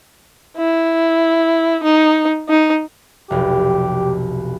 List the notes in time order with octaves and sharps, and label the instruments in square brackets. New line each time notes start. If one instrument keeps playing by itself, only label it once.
[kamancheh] E4
D#4
D#4
[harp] F1 B1 [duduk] G4